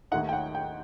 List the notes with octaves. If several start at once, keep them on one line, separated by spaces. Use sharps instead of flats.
D#2 D#3 A3 D#4 F#5
G5
F#5
G5